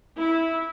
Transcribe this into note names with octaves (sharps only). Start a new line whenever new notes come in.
E4